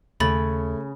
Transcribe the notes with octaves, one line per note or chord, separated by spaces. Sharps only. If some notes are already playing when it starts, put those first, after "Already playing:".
D#2 C#3 A3 B5 A6